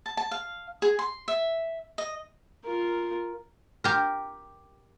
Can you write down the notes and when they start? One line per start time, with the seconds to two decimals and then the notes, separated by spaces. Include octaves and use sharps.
0.06 A5
0.17 A5
0.31 F5
0.82 G#4
0.99 C6
1.28 E5
1.98 D#5
2.65 F4 A#4
3.84 G4 A#4